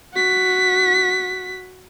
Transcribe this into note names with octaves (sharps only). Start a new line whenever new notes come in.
F#4 B6